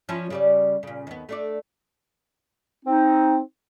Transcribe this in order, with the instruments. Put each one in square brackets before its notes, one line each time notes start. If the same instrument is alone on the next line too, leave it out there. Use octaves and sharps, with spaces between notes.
[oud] F3 C#4 E4
C#3 G3 D5
A#2 C#3
D#2 B3
A3 D4 D5
[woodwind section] C4 D#4